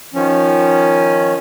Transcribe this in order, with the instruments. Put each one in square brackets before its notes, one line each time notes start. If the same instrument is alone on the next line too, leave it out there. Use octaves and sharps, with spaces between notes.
[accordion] D#3 F3 C#4